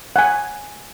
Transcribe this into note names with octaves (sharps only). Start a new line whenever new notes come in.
F#5 G#5